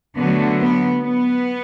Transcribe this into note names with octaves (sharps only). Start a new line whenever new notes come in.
D3 F#3 A3 B3
B3
B3